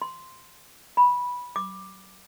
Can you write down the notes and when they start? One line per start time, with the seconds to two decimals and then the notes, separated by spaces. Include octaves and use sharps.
0.02 C6
0.97 B5
1.56 D6